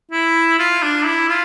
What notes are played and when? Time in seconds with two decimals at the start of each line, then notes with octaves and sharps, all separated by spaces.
0.11 E4
0.59 F4
0.82 D4
1.05 E4
1.29 F4